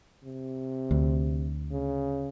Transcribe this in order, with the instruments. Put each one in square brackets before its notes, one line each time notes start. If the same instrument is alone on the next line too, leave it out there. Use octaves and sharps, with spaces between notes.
[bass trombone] C3
[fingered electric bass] D2
[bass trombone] C#3